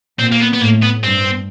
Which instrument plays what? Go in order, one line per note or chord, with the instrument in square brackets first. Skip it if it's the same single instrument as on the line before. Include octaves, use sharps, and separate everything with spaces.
[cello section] A#2 [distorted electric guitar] C4
[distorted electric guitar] A#3
B3
B3
[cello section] A2 [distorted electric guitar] A#3
[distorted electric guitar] B3
[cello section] G2 [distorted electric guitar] C4